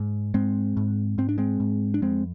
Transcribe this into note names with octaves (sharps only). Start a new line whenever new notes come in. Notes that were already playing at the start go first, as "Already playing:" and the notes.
Already playing: G#2
G#2 G#3 C4
G#2
G#2 C4
D4
G#3 C4
G#2
D4
F2 G#3 C4